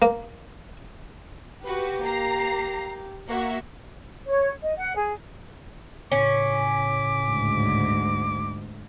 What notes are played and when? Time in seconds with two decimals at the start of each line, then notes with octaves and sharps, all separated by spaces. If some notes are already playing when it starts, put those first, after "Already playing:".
0.02 A#3
1.65 F#4 G4 B4
2.03 A#3 A#5 C7
3.28 A#3 F#4 E5
4.26 C#5
4.61 D#5
4.76 F#5
4.94 G#4
6.12 A2 C#3 C#4 D6 B6
7.30 D2 G#2